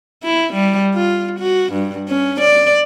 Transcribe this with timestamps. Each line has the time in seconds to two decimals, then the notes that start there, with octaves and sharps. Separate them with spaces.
0.23 E4
0.53 G3
0.94 F4
1.40 F#4
1.73 G2
2.08 C#4
2.41 D5